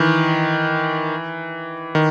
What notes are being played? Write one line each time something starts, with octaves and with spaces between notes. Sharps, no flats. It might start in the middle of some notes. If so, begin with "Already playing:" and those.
Already playing: D#3 E3
D#3